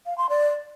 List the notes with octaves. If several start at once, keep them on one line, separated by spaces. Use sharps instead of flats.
F5
C6
D5